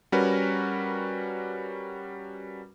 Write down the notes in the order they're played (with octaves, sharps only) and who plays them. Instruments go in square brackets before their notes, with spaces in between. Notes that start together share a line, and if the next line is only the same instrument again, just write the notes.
[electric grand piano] G3 C#4 F#4 A#4 B4